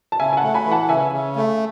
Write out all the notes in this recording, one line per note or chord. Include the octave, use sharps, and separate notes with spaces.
A5
C#3 E5 G#5
G#5
F#5 A5
A3
G#5 B5
E3
F#5 A5
C#3 E5 G#5
C#3
A3